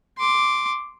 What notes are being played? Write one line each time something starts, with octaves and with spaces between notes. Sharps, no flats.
C6 D6